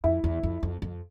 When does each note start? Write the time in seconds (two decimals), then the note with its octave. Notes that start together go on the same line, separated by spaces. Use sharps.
0.04 F2 E4
0.24 E2
0.43 F2
0.63 F2
0.82 F2